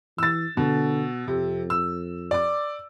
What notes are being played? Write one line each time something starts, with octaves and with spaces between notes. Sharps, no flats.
E3 E6 A6
B2 D3
F2 C3
E6
D5 D6